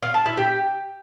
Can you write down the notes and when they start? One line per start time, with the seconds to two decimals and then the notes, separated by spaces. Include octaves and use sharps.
0.03 F5
0.14 A5
0.26 E4
0.37 G4